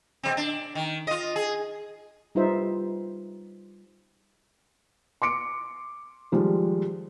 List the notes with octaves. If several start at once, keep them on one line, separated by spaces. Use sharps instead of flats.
B2 F#3 C4
D4
D#3
F4 D#5
G#4
G3 D#4 F4 B4 C5 E5
C6 D6 C#7 D7
D#3 F3 G3 G#3